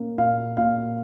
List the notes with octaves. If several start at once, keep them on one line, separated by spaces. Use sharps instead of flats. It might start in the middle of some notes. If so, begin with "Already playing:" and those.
Already playing: A#2 A#3 C#4
A#2 F5
A#2 F5